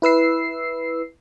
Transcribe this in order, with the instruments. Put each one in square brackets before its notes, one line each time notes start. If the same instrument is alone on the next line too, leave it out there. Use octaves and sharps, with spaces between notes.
[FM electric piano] E4 B4 E6 C7